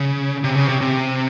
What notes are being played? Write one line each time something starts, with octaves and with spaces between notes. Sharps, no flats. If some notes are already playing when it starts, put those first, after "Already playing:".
Already playing: C#3
C3
C#3
C3
C3